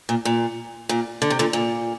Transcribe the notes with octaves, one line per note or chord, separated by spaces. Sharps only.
A#2
A#2
A#2
D3
C3
A#2 D3
A#2